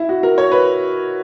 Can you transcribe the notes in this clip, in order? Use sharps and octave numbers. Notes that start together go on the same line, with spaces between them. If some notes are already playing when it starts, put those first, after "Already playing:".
Already playing: E4
F#4
A#4
C#5
B4